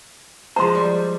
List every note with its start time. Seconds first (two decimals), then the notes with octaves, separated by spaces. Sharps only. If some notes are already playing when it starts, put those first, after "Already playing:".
0.56 F3 G#3 C5 A#5 C6
0.75 G3